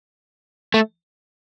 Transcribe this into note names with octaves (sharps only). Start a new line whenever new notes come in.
A3